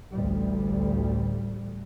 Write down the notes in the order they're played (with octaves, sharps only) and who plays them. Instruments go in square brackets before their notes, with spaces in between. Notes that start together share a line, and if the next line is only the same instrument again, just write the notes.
[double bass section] A1 D2 G3